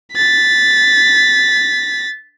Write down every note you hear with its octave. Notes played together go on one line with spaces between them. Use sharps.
A6 B6